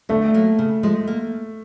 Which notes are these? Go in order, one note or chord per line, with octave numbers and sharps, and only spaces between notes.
D3 A3
F#3 A#3
C#3
F3 G#3
A#3